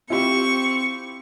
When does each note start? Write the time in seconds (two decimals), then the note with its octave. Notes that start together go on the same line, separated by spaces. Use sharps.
0.10 C4 E4 F4 G4 C#6